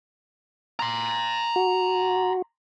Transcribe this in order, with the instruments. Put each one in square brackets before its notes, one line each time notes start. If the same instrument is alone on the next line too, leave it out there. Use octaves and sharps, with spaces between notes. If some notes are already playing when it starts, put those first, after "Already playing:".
[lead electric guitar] A#5 C6
[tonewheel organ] F#4